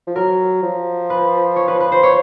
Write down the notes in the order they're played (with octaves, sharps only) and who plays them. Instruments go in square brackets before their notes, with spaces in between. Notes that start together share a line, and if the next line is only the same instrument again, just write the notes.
[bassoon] F3
[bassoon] F#3 [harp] A#4
[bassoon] F3
[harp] B4
C#5
B4
B4
C5
C#5